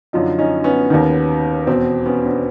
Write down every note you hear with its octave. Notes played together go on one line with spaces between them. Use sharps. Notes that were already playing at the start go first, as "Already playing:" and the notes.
F#2 D3 F3 D#4 F4
C#4 D#4
B3 C#4
D#2 D#3
E2 B2 C4
B3 C#4
C4 D4